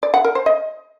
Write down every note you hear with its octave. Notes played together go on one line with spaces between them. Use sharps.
D5
F#5
A#4
C5
D#5